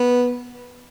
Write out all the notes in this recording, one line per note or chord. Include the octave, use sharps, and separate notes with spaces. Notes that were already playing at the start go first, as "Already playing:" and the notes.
Already playing: B3